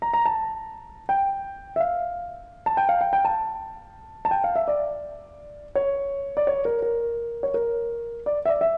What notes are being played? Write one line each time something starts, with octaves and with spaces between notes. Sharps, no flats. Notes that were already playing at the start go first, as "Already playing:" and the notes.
A#5
A#5
A5
G5
E5
F5
A5
G5
F5
G5
G5
A5
A5
G5
F5
E5
D5
C#5
D5
C#5
A#4
A#4
C#5
A#4
D5
E5
D5
E5